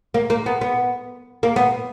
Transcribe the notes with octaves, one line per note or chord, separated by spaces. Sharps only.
A#3
A#3
B3
B3
A#3
B3